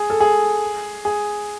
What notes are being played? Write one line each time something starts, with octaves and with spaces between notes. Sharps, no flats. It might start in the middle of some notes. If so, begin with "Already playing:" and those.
Already playing: G#4
A4
G#4
G#4